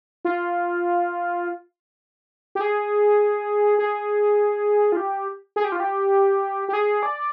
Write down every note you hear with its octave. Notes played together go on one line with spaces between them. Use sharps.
F4
G4
G#4
G#4
F4
G4
G#4
G4
F4
G4
G4
G#4
D5